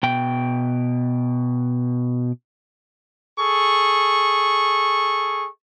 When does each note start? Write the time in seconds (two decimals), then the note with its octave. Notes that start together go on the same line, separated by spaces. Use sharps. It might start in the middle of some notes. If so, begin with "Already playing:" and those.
0.03 B2 G5
3.40 G#4 A4 C#6